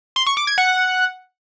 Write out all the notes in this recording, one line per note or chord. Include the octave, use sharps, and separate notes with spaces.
C6
C#6
D6
G#6
F#5